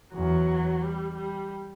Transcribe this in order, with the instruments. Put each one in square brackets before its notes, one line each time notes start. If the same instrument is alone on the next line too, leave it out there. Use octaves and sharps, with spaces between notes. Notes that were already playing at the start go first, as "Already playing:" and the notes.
[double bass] E2 [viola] F#3
[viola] G3
G3